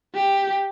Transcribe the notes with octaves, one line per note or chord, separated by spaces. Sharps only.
G4